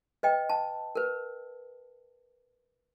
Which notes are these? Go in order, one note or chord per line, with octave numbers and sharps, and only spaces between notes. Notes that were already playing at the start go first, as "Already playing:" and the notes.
B4 D#5 G5
A5
A#4 B4